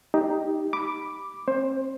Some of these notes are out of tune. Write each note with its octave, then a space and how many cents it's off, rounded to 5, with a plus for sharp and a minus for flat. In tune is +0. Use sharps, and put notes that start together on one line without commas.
D#4 +10 G4 +0
B5 +0 D6 +0
C4 +40 C5 +15